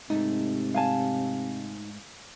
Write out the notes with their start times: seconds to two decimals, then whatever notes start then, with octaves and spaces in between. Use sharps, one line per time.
0.10 G#2 C3 A3 D#4
0.74 F5 G#5 A5